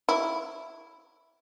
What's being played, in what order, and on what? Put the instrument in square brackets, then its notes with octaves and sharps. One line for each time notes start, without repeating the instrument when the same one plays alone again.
[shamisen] E4